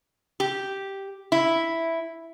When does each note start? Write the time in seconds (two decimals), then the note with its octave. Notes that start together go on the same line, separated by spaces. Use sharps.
0.40 G4
1.32 E4